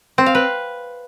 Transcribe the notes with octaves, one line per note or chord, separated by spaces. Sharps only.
C4
F5
B4